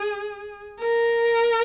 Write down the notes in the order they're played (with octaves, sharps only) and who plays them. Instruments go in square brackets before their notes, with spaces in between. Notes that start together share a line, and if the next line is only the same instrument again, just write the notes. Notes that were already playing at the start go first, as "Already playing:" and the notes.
Already playing: [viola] G#4
A#4